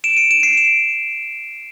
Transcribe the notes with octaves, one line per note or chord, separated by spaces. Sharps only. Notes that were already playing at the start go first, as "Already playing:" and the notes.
D7 E7
C#7 D#7
D7 E7
C7 D7
D7 E7